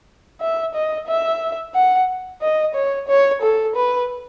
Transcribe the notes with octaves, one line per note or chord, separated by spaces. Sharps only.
E5
D#5
E5
F#5
D#5
C#5
C#5
A4
B4